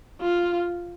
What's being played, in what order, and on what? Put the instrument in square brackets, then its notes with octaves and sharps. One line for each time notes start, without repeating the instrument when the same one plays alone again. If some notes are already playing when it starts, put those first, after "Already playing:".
[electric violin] F4